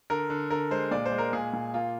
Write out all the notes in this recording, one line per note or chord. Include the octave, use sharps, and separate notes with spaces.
D3 A#4
D3
D3 A#4
G#3 C5
A#2 D5
C5
G#3
A#4
A#2 G#4
A#2
A#3 F4